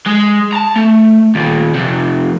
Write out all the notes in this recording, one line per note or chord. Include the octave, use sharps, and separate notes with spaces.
G#3
A5 A#5
A3
D#2 A#2
F2 C3